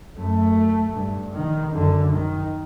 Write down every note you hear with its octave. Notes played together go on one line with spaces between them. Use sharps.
F#2 A3
G2
D#3
F#2 D3
D#3